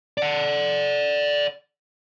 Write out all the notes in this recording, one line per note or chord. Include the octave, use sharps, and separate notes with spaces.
D5 F#5